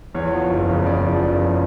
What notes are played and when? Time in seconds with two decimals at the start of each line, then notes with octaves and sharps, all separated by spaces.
0.15 E2 C#5
0.32 F3
0.50 F#1
0.69 C#3
0.86 E2 D5
1.05 F3
1.23 F#1
1.41 C#3